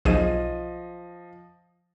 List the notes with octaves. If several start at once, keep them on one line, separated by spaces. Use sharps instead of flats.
B1 F3 G#4 D#5 D#7